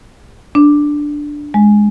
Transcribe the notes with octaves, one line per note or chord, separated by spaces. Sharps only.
D4
G#3